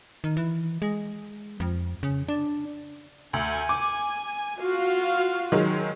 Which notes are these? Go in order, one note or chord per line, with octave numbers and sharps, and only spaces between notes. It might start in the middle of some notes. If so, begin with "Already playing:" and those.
D#3
E3
G#3
F2
C#3
D4
D2 G#5
D6
F4 F#4 F5
D#3 F#3 G#3